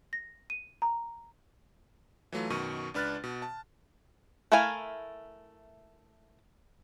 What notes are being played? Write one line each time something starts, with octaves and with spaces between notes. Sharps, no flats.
A#6
D#7
A#5
E3 F#3 A3 F4
F#2 B2 D#3 C#6 D#7
C#2 D4 B4 F6 F#6 A6
B2
A5
A3 E4 A#4 F5 G#5